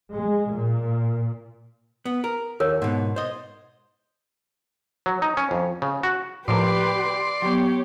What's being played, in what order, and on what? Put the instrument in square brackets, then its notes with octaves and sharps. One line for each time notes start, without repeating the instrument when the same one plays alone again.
[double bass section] G#3
A#2
[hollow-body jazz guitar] B3
A#4
[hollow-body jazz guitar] D#2 [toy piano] A#4 C#5
[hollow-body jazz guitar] G#2 B2
C5 D#5
[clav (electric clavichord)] F#3
D#4
C#4
F2
C#3
F#4
[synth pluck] A2 F3 A#3 [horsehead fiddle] G4 B4 [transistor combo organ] D5 C6
[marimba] F#3 B3 [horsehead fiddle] G4 C#5